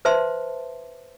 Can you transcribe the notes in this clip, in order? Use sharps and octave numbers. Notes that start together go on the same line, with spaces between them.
B4 C5 E5 A5 C6